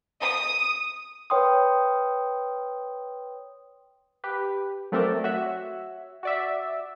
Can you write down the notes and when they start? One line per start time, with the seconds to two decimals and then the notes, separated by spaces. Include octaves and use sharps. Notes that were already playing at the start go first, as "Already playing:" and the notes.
0.21 D#6
1.30 B4 C#5 G5 C6 D#6
4.24 G4 B4
4.92 F#3 A3 C4 A4 A#4 D5
5.24 F#4 C#5 E5
6.23 F#4 D5 E5